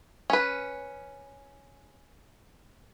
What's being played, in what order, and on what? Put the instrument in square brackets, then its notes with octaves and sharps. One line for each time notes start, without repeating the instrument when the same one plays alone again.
[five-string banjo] C#4 B4